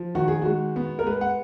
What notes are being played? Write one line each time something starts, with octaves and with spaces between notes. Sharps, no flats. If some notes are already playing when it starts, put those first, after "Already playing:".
Already playing: F3
D#3 F#4
G#4
G#3 F#4
B3
A#4
G#3 B4
F#5